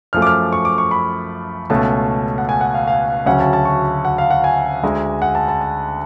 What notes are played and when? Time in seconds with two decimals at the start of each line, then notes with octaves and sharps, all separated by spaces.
0.13 F#2 F3 A3 F6
0.22 D6
0.27 F6
0.53 C#6
0.65 D6
0.78 C#6
0.91 B5
1.70 C#2 B2 A3 C#4 A5
2.38 F#5
2.49 G#5
2.61 F#5
2.74 F5
2.87 F5
3.26 D2 C#3 F#3 C#4 F#5
3.40 A5
3.53 A5
3.65 C#6
4.05 F#5
4.18 F5
4.31 F#5
4.44 G#5
4.83 D2 D3 G#3
5.22 F#5
5.35 A5
5.48 A5
5.61 A5